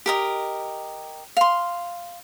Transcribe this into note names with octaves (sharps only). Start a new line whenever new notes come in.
G4 A#4 D#5
F5 C6